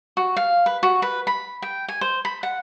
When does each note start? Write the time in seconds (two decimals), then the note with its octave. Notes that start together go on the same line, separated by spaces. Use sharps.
0.17 F#4
0.37 F5
0.66 B4
0.83 F#4
1.02 B4
1.27 B5
1.62 G5
1.88 G#5
2.01 C5
2.25 B5
2.43 F#5